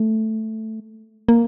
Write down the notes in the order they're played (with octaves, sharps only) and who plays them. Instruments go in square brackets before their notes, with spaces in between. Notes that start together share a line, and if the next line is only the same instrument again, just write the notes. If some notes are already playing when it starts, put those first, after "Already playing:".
Already playing: [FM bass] A3
A#3